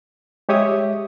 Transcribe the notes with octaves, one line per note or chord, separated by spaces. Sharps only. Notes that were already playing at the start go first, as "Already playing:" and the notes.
G#3 G4 C#5 E5 D#6